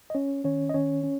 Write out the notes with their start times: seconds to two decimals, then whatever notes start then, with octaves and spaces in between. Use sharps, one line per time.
0.10 D#5
0.14 C#4 C#5
0.44 D#3 C#4 C#5
0.70 D#5
0.74 D#3 C#4 C#5
1.04 C#4